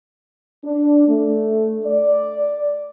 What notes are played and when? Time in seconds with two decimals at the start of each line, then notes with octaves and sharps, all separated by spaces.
0.64 D4
1.08 A3
1.85 D5